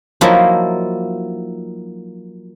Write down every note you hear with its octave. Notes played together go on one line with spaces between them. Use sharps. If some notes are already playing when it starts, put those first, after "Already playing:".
F3 F#3 A#3 D#4 E4